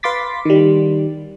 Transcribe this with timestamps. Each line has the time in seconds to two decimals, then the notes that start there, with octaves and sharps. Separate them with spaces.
0.03 B4 F5 C6 D6 A6 B6
0.45 D#3 G3